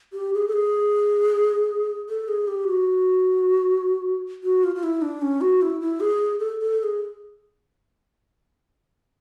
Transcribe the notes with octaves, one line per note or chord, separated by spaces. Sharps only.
G4
G#4
A4
G#4
A4
G#4
G4
F#4
F#4
F4
F4
E4
D4
C#4
F#4
E4
E4
G#4
A4
A4
A4
G#4